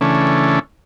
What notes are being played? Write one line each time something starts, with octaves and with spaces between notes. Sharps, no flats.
C#3 E3 A3 C#4 D4